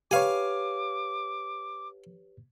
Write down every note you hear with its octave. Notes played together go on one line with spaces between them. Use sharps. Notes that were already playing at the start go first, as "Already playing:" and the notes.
G4 B4 C#5 F5 G#5 D6